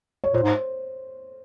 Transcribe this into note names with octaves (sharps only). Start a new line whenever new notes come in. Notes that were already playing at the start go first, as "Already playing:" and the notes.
C#5
A#2 C5
G#2